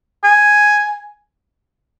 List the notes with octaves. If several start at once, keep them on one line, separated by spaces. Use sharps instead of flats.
G#5